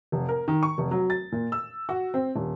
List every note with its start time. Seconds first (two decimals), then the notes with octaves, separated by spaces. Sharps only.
0.12 F1
0.29 A#4
0.48 D#3
0.63 C#6
0.78 F1
0.91 F#3
1.10 A6
1.32 A#2
1.52 E6
1.89 F#4
2.14 C4
2.36 D#1